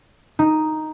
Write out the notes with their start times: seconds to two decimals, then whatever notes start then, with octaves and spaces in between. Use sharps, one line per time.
0.39 D#4